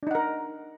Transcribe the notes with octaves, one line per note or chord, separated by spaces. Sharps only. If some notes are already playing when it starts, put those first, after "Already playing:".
D4 D#4 A#4 F#5